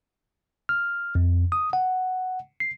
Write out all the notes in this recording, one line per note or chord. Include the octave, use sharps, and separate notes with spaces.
F6
F2
D#6
F#5
C7